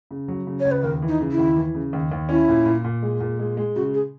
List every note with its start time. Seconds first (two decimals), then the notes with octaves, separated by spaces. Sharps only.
0.11 C#3
0.28 F#3
0.47 C#3
0.60 C#2 C#5
0.71 B4
0.83 D#2 A#4
1.02 E3
1.08 D#4
1.20 C#3
1.32 E4
1.38 D#2
1.56 E3
1.75 C#3
1.93 D#2
2.11 D#2
2.29 C#4 E4
2.48 A#2
2.66 A#2
2.84 A#2
3.02 G#3
3.20 A#2
3.39 G#3
3.57 G#3
3.76 C#3 F#4
3.94 G#4